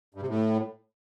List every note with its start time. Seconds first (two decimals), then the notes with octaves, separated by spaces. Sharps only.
0.14 G2
0.21 C3
0.28 A2